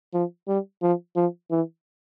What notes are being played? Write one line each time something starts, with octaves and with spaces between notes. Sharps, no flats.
F3
G3
F3
F3
E3